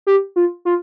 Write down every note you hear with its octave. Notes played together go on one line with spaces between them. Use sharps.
G4
F4
F4